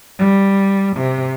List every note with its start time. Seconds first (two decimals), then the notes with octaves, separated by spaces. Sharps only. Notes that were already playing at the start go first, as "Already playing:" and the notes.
0.19 G3
0.97 C3